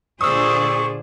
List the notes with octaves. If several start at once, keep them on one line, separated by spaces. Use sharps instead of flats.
A#2 D3 G#4 C5 D5 C#6 D#6 E6